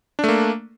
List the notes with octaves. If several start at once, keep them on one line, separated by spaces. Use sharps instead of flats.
A3 A#3 D4